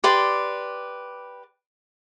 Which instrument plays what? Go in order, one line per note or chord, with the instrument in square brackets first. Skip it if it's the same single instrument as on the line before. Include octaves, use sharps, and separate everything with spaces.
[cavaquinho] G4 B4 D5 C6